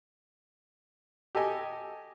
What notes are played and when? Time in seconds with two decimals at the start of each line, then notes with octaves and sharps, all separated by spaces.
1.35 G4 A4 D#5 G#5